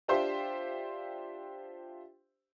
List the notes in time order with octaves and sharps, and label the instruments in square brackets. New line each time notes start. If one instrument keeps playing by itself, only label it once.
[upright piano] D4 F4 G4 C5 E5 C6